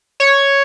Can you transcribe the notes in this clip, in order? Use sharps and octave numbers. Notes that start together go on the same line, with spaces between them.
C#5